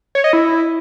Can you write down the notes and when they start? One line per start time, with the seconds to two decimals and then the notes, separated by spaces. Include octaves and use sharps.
0.15 C#5
0.24 D#5
0.33 E4